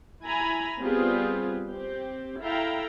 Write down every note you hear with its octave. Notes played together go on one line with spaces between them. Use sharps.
E4 G#5 A#5 B5
G3 B3 C4 F4 G#4 B4
C4 G4
E4 A4 E5 F5 G5 A#5